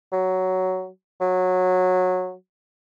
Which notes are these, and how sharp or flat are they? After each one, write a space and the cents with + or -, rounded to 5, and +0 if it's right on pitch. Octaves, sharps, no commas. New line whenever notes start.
F#3 +10
F#3 -15